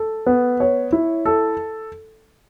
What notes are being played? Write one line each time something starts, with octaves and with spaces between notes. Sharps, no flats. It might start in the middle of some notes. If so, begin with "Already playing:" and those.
Already playing: A4
B3
C#5
E4
A4